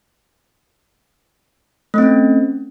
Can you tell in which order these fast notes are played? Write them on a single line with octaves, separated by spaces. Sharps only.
A3 C4 C#4